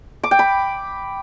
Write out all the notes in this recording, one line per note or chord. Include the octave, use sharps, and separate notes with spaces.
D6
G5
B5